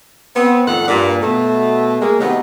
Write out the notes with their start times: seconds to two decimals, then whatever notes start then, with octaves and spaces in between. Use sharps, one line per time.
0.36 B3 C4
0.67 F2 A2 D#3 A4 F#5
0.87 G2 A#2
1.21 B2 A3
2.02 G#3 A#3
2.20 C3 D#3 F#3 A3 B3 D#4